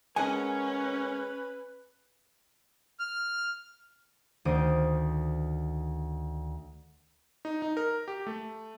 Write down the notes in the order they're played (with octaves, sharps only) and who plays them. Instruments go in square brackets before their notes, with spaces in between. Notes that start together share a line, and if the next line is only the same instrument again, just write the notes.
[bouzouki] G#3 A#4 F#5 [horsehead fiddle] C#4 [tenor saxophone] B4 [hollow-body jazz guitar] G#5
[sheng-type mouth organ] F6
[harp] D2 D#3 C5 D#6 D7
[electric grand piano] D#4
D#4
A#4
G4
A3